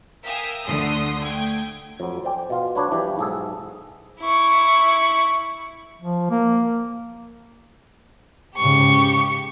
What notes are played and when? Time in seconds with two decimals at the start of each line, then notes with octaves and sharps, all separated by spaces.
0.24 A#4 E5 F5 G5 G#5 D#6
0.66 D2 D3 A3 C6 D#6
1.22 A3 G5 G#6
2.00 F2 F#3
2.24 C5 D5 G5 G#5
2.50 B2 F4 F5
2.75 F#3 D4 B4 C#5
2.92 E3 F3 G3 G4
3.18 B1 G#2 G#4 A4
4.20 E4 C#6
6.01 F3
6.30 A#3
8.57 G#2 C#3 G4 C#6